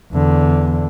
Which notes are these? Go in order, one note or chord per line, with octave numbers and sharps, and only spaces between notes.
E2 D3